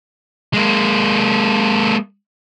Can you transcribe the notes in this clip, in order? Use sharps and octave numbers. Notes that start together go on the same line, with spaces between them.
G#3 A#3